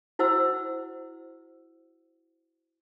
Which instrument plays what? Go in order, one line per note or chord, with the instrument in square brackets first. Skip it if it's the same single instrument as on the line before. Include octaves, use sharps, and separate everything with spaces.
[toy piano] E4 F#4 C5 F#5 E6